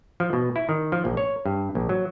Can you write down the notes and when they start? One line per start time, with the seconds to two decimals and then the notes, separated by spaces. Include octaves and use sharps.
0.20 F3
0.33 B2
0.56 E4
0.69 D#3
0.92 F3
1.05 A#1
1.17 C#5
1.46 G2
1.75 A#1
1.89 F#3